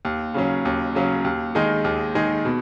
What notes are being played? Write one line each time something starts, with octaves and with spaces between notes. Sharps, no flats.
D#2
C#3 F#3 C#4
D#2
C#3 F#3 C#4
D#2
D#3 G#3 D#4 G#4
D#2
D#3 G#3 D#4 G#4
B2